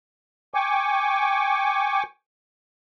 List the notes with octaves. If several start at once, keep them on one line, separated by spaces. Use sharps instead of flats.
G5 G#5 C#6 D6